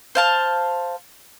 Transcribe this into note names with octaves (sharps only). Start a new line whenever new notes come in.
C5 F5 A5